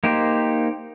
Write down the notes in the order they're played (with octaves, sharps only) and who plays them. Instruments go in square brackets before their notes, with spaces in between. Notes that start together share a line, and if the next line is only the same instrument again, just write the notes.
[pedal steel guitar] A#3 D#4 G4 C5